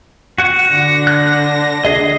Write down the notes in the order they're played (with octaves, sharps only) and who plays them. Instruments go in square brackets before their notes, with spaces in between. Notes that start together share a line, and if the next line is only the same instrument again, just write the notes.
[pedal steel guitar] F#4 F#5
[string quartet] D3 A#6
[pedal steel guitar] F#6
G#4 D#5